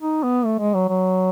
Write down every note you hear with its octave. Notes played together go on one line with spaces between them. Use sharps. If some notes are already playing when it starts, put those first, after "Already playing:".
D#4
B3
A3
G#3
F#3
F#3